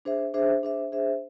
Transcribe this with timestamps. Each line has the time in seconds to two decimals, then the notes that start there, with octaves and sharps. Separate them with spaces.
0.05 D4 G#4 C5 E5
0.34 D4 G#4 C5 E5
0.63 D4 G#4 C5 E5
0.92 D4 G#4 C5 E5